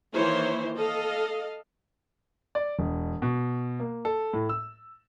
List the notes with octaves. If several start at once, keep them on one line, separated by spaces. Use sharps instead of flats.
D#3 E3 A#3 E4 C5 C#5
A4 D#5 F5
D5
E1
B2
A#3
A4
A2
E6